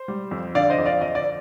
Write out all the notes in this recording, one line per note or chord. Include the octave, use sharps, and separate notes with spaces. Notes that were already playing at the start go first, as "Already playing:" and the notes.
Already playing: C5
G3
F2
D3 D5 F5
C5 D#5
F2
D5 F5
F2 D#5
D5